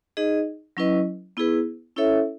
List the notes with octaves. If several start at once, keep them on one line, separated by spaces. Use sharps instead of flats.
D#4 G#4 D#5
F#3 C#4 E4 B4 D#5
B3 E4 G#4 B4
C#4 E4 A4 C#5 E5